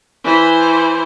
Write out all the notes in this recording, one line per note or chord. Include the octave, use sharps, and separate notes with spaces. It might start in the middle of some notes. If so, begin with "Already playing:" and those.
E3 C5